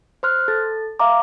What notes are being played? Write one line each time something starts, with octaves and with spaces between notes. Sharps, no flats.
C5 C6 F6 F#6
A4 A6
E5 F5 A#5 D6